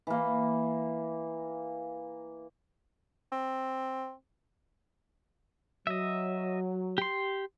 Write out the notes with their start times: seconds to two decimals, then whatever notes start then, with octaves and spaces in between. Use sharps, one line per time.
0.07 E3 A#3
3.32 C4
5.87 F#3 D#5 E5
6.98 G4 C6